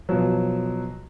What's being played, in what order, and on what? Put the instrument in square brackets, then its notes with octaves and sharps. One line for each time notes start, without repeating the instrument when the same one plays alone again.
[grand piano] B2 F3 F#3